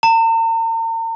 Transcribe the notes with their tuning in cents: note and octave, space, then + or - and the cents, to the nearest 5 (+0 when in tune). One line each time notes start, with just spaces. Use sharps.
A#5 -45